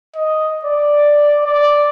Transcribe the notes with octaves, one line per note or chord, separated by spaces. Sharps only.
D#5
D5
D5